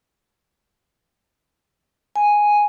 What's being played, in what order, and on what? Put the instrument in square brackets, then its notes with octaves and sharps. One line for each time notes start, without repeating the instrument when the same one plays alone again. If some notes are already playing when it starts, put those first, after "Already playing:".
[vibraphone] G#5